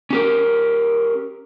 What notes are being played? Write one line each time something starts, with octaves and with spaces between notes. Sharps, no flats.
C#4 G4 A#4